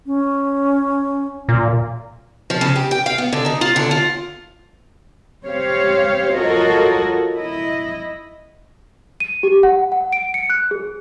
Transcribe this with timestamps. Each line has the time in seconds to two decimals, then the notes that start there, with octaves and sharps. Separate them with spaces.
0.06 C#4
1.49 A#2
2.50 F3
2.61 C#3
2.76 G4
2.91 G5
3.06 F5
3.18 B3
3.33 D3
3.46 D#4
3.61 F4
3.76 D3
3.91 F4
5.46 C4 G4 C5 C#5 F5
6.34 F4 F#4 A4 A#4 C#5 D#5
7.33 E4 D#5
9.20 D#7
9.43 G4
9.63 F#5
9.92 F#5
10.13 D7
10.34 C#7
10.50 F#6
10.71 G#4